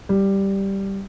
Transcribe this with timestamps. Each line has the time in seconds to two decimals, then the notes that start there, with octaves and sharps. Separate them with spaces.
0.09 G3